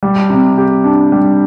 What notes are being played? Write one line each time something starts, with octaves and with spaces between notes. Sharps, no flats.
G3
C3
G4
D4
G3